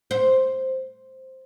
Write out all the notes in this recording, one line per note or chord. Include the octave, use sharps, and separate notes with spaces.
C5